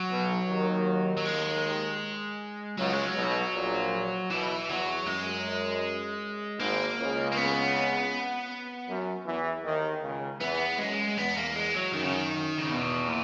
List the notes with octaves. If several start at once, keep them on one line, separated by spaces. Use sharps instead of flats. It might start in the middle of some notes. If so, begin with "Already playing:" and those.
Already playing: F#3
B1 B2
D#2 D#3
F#3
G#3
C#2 C#3 F#3
G#3
F#3
B1 B2
A#1 A#2
B1 B2 E3
E2 F#3
F#2 G#3
G#1 G#2 A#3
C#2 C#3
A#3
B3
F#2
E2 E3
D#2 D#3
C#2 C#3
E2 E3 B3
F#2 G#3
E2 B3
A#3
G#3
F#3
F#2 D#3
C#3
D#3
C#3
E2 B2
A#2